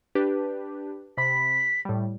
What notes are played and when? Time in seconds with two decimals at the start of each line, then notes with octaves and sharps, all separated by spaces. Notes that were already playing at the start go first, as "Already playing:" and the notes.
0.15 D4 G4 B4
1.17 C3 B5 B6
1.85 A2 G3